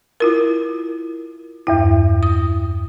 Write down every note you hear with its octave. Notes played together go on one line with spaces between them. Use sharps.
E4 F4 A#4
E2 G2 E4
D#6